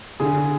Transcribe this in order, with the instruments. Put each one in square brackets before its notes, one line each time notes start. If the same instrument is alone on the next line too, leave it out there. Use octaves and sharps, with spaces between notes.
[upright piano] D3 [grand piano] G#4